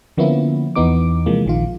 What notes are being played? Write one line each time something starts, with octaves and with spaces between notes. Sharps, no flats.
D3 F3 A#3 B3 C#4 E4
E2 E3 B3 D#4 D6
C3 E3 F3 G#3 A#3
A#1 D#3 F4